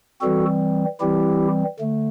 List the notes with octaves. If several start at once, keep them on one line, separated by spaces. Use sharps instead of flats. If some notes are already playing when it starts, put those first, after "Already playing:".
E3 G3 C4 F#4 A4
E3 G3 C4 E4 G4
D3 A3